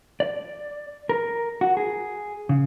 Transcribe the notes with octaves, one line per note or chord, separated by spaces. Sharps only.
D5
A#4
F#4
G#4
C#3